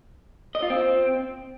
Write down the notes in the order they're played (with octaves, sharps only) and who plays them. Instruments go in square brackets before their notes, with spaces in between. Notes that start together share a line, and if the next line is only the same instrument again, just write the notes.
[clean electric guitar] D#5
F4
C4